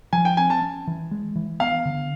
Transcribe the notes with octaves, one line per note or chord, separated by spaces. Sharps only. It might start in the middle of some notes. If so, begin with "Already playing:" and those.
F3 G#5
G5
C4 G#5
A5
C#4
E3
G#3
E3
B3 F5
D3